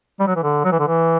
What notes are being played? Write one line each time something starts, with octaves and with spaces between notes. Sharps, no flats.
G3
F#3
E3
D3
F#3
E3
D3
E3